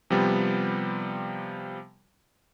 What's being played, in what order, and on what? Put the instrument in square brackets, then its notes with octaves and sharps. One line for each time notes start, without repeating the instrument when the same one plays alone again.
[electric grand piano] C3 F3 G3 B3